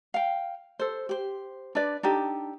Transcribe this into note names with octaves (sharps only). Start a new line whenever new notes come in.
F5 G5
A4 C5
G4 C5
D4 B4 D5
D4 D#4 G4 A4